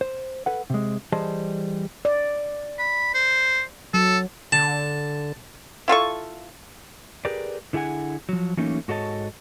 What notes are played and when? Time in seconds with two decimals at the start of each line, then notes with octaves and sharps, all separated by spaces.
0.01 C5
0.46 A4 B4 F#5
0.70 C3 G#3
1.12 E3 G3 G#4 C5 D#5 A5
2.05 D5
2.79 B5
3.14 C5
3.94 F#3 A4
4.52 D3 A5
5.88 E4 F4 A4 C#6
7.25 G4 G#4 A#4 B4 D5
7.73 D3 E4 G#4 F#5 G#5
8.29 F3 F#3
8.57 E3 F#3 A3 A#3 C#4 D#4
8.88 G#2 F#4 A4 C#5 D#5 A5